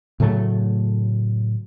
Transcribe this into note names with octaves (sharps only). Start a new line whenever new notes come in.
A2 C#3 F#3 A3